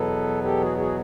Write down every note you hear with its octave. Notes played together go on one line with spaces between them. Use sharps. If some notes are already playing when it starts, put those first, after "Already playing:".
Already playing: E2 B2 F#3 B3 A4 B4
G4 A4
F#4 G#4
F#4 G#4